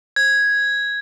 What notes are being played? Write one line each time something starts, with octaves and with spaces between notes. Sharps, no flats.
G#6